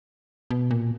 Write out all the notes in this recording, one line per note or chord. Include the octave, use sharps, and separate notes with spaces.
B2
A#2